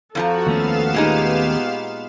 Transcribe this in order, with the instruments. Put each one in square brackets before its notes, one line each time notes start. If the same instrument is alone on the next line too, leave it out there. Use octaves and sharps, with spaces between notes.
[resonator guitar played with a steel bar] F2 F3 A#5 [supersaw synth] F#4 [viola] A4
[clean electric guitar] D#2 A3 C#4 [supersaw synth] B3 F5 E7
[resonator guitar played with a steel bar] A#2 G#3 D#4 [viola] G4